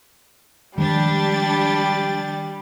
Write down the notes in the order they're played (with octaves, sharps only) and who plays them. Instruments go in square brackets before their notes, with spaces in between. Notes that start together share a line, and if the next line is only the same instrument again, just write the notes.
[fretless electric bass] D#3 F3 G#3 [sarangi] G3 [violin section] D4 G4 A6